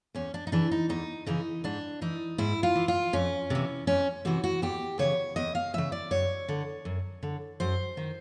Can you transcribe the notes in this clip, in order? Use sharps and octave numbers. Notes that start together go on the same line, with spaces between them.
E2 C#4
D4
D#4
C#3 E3 D4
D#4
E2 D#4
C#3 E3 D#4
G#2 D4
E3 D#4
G#2 E4
F4
E3
F4
F2 C#4
C3 E3
F2 C#4
C3 E3 F#4
F#4
E2 G4
C#3 E3 C#5
E2 D#5
F5
C#3 E3 E5
D5
F#2 C#5
D3
F#2
D3
F#2 C5
D#3